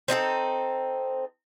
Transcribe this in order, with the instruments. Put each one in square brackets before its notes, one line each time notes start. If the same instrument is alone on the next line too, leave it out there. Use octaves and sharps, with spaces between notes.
[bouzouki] C4 D#4 G#4 A4